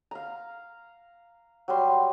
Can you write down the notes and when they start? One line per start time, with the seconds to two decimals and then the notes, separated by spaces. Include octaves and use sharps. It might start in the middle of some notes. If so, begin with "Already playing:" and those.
0.11 F5 A#5
1.68 F#3 G3 C6